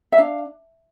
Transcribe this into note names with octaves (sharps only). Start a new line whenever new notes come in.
E5
D4 F5